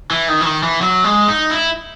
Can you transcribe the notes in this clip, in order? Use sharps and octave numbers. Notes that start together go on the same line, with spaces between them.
E3
D#3
E3
D#3
E3
F#3
G#3
D#4
E4